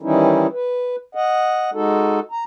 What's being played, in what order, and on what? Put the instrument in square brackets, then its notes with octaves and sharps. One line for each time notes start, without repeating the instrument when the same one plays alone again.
[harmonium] D#3 E3 G3 C#4 D#4 E4
B4
D#5 F#5
G#3 D#4 F#4 A4
A#5